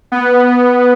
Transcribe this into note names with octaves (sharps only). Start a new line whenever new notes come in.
B3